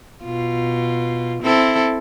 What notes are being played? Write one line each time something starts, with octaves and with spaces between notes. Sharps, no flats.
B2 F4
C4 E4 A4